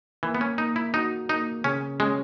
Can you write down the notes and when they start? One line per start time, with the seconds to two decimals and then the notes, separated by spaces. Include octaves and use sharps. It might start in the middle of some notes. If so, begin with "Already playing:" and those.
0.23 E3 A#3
0.35 B3
0.41 C#4
0.58 A#3 D#4
0.76 E4
0.94 D#4 F#4
1.29 A#3 D#4
1.64 C#3 C#4
1.99 G#3 C#4